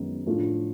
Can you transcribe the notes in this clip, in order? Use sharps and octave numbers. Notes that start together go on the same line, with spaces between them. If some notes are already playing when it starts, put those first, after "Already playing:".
Already playing: F#2 D#3 G#3 B3 D#4
A2 F3 A3 D4 F4